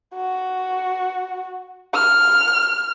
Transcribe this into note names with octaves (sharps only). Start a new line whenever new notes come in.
F#4
F6